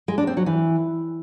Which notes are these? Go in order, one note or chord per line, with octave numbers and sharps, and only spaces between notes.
G#3
D4
C4
F#3
E3